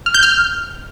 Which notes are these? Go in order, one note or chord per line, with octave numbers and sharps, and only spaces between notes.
F6
G6
F6